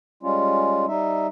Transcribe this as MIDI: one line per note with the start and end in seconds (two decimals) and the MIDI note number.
0.23 0.85 55
0.23 0.85 56
0.23 0.85 61
0.23 0.85 65
0.88 1.27 55
0.88 1.27 63
0.88 1.27 76